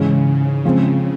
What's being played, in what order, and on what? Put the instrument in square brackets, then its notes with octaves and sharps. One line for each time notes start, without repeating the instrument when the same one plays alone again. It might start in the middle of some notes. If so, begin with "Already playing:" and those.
Already playing: [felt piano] G#2 E3 G#3 C#4 [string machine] C#3
[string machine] C#3 [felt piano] F3 G#3 C4